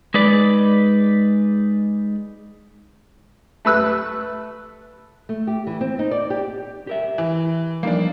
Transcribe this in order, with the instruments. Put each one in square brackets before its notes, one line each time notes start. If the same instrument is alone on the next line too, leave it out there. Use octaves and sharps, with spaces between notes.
[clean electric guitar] G#3 D#4 B4 D5
[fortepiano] A3 B4 E6 F#6
[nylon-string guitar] A3
G4
E3
C4
D#4
D5
G4
[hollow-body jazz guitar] G4 A#4 E5
[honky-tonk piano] E3
[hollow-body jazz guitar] F3 G3 D#4 [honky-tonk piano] A#3 D4